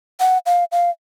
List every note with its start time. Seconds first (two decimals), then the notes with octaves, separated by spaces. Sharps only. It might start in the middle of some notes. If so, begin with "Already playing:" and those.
0.20 F#5
0.46 F5
0.72 F5